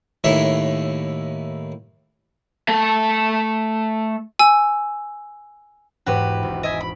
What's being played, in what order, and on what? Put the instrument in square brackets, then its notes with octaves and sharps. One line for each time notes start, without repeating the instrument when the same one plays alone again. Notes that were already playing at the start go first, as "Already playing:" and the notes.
[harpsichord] D#2 A2 E4 C#5
[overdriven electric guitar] A3 A5
[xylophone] G#5 E6
[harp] E1 G#2 [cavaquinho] F#4 G4 B4
[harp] G#1
[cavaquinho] D#5 E5 G#5 [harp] B6 D7
[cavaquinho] B5